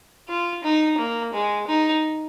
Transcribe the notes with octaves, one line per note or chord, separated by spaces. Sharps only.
F4
D#4
A#3
G#3
D#4